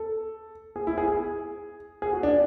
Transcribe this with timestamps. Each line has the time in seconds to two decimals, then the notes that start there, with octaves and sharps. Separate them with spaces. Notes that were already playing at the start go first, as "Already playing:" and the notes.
Already playing: A4
0.76 G#4
0.87 E4
0.98 G#4
1.08 G#4
2.02 G#4
2.13 F#4
2.23 D4